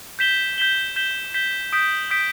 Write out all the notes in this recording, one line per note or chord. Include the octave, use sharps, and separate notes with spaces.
G6 B6 E7 G7
G6 B6 E7 G7
G6 B6 E7 G7
G6 B6 E7 G7
D#6 G6 B6 D7
D#6 G6 B6 D7